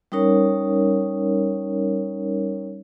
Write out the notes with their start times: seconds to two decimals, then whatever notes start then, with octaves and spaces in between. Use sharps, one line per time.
0.12 G3 C#4 D#4 A#4 C#5